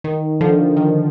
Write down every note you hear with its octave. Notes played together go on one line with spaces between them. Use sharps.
D#3
D3 F3
D#3